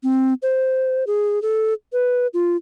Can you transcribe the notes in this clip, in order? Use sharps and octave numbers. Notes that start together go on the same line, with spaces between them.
C4
C5
G#4
A4
B4
F4